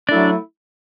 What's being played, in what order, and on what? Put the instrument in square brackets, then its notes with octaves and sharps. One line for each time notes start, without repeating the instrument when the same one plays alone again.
[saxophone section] F#3 A3 E4 [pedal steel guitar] D4 D5